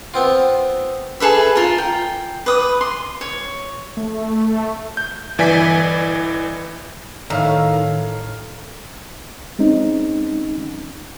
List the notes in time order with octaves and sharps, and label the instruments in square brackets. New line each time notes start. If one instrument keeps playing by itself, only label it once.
[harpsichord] B3 C4 F4
[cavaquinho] G#4 A4 B4 E5
F4 A#4
G5
B4 D#6
C6
C#5
[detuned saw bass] A3
[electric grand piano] G6
G1 E3 D5 G#5 B6
[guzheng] A2 [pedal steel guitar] D#3 [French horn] A4 [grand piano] C#5 F5 A#5
[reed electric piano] G#3 C4 C#4 D#4